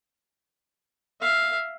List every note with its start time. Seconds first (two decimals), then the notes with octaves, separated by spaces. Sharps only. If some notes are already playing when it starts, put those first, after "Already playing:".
1.21 E5 F5